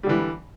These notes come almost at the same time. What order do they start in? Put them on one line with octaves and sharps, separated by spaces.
G3 D3 E3